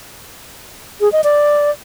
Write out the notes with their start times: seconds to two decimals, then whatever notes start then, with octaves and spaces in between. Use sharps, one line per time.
1.01 G#4
1.12 D#5
1.24 D5